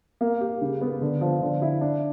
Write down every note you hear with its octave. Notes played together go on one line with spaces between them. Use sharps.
A#3
G4
C#3
B3
D3
F3
D3
E4
D4